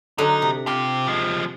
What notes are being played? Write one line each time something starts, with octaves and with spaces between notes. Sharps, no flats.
D3 F#3 D4 D#4
C3
C4 F4 G4
F3 G#3